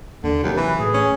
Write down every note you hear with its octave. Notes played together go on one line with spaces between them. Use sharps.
D#2 D3
D#2 C3 F#3
E3 B4
A2 G#4
C#4